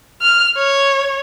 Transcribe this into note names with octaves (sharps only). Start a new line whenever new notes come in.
F6
C#5